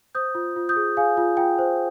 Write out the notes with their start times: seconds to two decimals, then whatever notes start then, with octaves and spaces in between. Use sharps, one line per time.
0.15 C5 D#6 G6
0.35 F4
0.56 F4
0.69 D#6 G6
0.76 G#4
0.97 G#4 F5 G#5
1.17 F4
1.37 F4 G5
1.59 C5